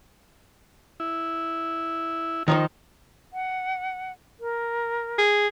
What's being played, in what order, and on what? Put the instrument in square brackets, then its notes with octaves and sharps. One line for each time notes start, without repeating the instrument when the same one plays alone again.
[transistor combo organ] E4
[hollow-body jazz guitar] D#3 F3 D#4
[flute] F#5
A#4
[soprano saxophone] G#4